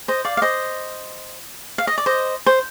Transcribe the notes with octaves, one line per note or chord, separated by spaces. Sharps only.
C5 D#5
D5 F5
F5
C5 D#5
F5
D#5
D5
C5 D#5
C5